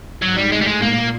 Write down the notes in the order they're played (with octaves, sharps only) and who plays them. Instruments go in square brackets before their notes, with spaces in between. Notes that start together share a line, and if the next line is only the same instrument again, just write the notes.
[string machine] G#2 [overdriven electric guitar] F#3
[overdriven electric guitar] G3
[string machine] A2 [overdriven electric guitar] G#3
[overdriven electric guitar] G3
G#3
[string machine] A#2 [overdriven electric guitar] A#3